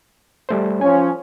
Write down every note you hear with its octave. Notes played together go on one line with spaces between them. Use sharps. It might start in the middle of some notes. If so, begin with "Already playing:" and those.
G3 A3 C5
F3 C#4 G#5